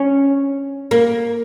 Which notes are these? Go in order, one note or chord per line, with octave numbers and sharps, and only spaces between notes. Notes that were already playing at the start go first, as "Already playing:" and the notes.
Already playing: C#4
A#3